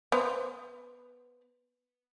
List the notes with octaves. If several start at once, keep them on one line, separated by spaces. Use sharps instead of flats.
B3 C5